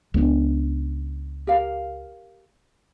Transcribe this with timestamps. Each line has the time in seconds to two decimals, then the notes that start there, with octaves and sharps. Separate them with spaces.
0.14 C#2 B3 D4
1.47 G4 A#4 F5